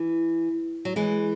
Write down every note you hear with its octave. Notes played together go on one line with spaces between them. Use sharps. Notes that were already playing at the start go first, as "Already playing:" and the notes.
Already playing: E3
F#3
E3 G#3